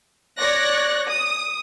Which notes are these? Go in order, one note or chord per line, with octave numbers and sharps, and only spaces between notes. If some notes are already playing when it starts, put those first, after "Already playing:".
C#5 D5 F#6 A#6
D#6